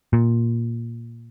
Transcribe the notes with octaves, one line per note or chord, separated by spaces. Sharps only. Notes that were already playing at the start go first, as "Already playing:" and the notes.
A#2